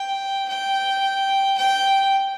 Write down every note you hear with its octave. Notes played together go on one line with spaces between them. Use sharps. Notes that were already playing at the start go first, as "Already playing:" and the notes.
Already playing: G5
G5
G5